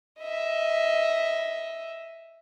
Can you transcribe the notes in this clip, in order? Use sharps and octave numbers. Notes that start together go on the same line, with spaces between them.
D#5 E5